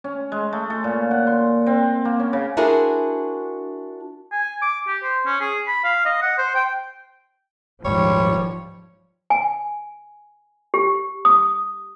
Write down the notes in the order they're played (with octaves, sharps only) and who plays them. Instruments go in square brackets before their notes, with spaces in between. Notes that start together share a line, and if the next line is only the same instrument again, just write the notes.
[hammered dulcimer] C#4
G#3
A3
A4
A#2
F#5
C6
C4
A#3
C#4
C#3
[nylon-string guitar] D4 E4 F#4 G#4 A#4 C5
[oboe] G#5
D6
G4
C5
C#4
G#4
B5
F5
D#5
F#5
C5
G5
[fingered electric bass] D#1 G#2 D#3 [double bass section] F3 [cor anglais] G3 [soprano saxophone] C#5
[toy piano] G#5
G4
D#6